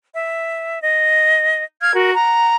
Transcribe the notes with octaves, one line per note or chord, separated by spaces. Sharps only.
E5
D#5
F5 F6 G#6
F#4 A#4
F#5 A#5